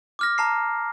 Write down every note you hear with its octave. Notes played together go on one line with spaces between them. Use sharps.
D6 F6 A#6
A5 A#5 C7